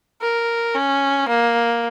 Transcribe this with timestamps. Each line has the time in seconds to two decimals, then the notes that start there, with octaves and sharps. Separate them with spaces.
0.21 A#4
0.75 C#4
1.29 A#3